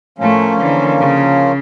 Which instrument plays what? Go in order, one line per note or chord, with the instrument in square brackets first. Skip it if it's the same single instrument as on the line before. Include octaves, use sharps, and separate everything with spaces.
[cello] A2 A3 [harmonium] F3 A#3 C#4
[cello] D3 E3
C#3